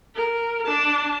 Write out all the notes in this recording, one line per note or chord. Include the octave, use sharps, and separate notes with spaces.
A#4
D4 A5